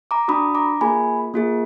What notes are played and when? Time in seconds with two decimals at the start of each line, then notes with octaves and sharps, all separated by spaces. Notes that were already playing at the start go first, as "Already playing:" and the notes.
0.11 A#5 D6
0.28 D4 F#4 B5 D#6
0.55 A#5 D6
0.81 A#3 F4 G#4 G#5 B5
1.34 A#3 F4 G#4